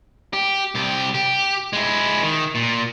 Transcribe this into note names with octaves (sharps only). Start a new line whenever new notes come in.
G4
C2 G4
G4
G#3 E4
D#3
A#2